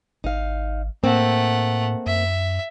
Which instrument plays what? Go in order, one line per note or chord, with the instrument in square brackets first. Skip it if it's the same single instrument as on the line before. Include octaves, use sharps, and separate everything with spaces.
[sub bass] G#1 [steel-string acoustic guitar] D#4 F5
[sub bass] A2 [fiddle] A3 F#5 [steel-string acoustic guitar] A#3 C4
[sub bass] F#2 [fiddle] E5